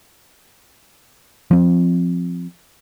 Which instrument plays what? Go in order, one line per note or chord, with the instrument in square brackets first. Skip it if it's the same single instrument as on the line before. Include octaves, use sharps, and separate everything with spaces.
[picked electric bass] F3 C4